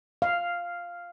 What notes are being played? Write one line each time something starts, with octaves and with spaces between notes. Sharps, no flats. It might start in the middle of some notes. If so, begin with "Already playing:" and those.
F5